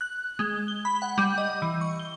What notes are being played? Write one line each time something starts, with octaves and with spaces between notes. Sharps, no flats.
F#6
G#3
G7
B5
F#5
G3
D#5
E3
C#6
G7